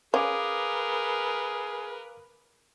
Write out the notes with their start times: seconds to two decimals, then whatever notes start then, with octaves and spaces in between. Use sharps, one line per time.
0.14 C#4 G#4 A#4 B4 F5 D6